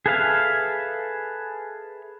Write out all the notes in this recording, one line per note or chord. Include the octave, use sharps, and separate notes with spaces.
G#4 A4 B4 E5 F5